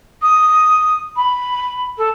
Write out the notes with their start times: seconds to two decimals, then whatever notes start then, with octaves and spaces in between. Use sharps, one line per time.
0.21 D#6
1.16 B5
1.97 A4